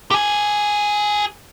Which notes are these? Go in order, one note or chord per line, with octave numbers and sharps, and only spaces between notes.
G4 G#5